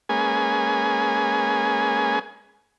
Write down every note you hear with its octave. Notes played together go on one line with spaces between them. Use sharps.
G#3 A#3 C#4 G#4 B4 G#5